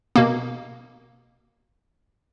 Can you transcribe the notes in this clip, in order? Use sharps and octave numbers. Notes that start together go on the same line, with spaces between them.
B2 A#3